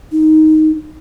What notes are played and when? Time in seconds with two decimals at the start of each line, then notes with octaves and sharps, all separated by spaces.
0.12 D#4